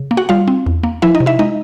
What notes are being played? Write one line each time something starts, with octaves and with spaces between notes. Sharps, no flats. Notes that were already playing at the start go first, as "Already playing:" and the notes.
Already playing: C#3
A#3
F#4 F#5
G3 F4 F5
C4
E2
A#3
F3 E4 E5
D#4 D#5
C3
E4 E5
G#3 D#4 D#5